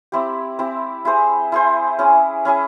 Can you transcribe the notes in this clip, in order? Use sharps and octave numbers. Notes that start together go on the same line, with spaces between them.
C4 E4 G4
C4 E4 G4
E4 G#4 C5
E4 G#4 C5
C#4 E4 G#4
C#4 E4 G#4